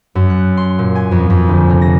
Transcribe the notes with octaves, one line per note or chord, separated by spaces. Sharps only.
F#2
F#6
C6
A#2
G#5
F2
F2
D2
C3
A#6